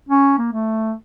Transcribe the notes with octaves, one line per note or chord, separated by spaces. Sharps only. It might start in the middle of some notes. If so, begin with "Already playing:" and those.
C#4
A#3
A3